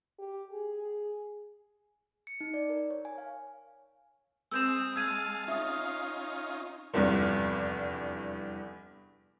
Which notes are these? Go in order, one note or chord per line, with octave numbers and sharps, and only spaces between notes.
G4
G#4
C#7
D#4
D5
A#4
C#5
G#5
F5
G#3 C4 D#6 E6 G6 E7
G#3 F5 A5 E6 F6 G#6 D#7
C#4 D#4 F4 E5 D#6
F1 E2 G2